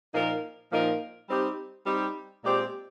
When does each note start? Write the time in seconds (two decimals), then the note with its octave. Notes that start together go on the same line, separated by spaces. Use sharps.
0.13 A#2 F3 A#3 D#4 A#4
0.72 A#2 F3 A#3 D#4 A#4
1.29 G3 C4 D#4 G4
1.86 G3 C4 D#4 G4
2.43 A#2 G#3 C4 G4 D5